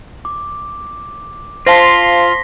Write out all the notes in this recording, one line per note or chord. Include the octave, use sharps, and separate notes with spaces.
D6
F4 C5 F5 A5 C6 A#6 B6